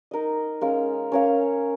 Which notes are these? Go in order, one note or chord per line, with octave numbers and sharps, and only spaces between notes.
D#4 A#4 D#5
G#3 C#4 A#4 F5
C#4 A#4 C#5 F5